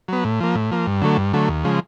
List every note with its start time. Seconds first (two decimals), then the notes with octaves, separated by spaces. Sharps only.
0.08 F#3 B3
0.24 A2
0.40 F3 A#3
0.55 A2
0.71 F3 A#3
0.87 G2
1.02 D3 F#3 A3
1.17 G2
1.33 D3 F#3 A3
1.49 D#2
1.64 C#3 F3 G#3